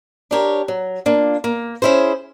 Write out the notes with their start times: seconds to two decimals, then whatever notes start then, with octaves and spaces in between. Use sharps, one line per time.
0.31 D4 G4 A#4 C#5
0.68 F#3
1.06 A#3 D4 F4
1.44 A#3
1.82 C#4 E4 G#4 C5